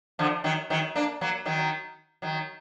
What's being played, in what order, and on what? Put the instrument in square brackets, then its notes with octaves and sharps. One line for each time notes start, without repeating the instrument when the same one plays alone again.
[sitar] D3 F3
D#3 F#3
D#3 F#3
A#3 D4
F#3 A#3
D#3 F#3
D#3 F#3